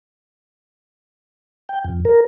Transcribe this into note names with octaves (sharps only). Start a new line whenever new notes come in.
G5
F2
A#4